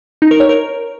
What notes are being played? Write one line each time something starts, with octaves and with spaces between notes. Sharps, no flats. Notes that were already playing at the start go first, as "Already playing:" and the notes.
D#4
A#4
C#5
A#4